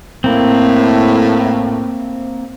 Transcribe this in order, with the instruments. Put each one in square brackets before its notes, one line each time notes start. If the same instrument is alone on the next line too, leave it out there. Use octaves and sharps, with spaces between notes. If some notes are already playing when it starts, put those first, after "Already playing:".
[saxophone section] A2 [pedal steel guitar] A#3 C4